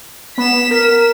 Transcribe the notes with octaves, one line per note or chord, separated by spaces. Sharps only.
B3 B6 E7
A#4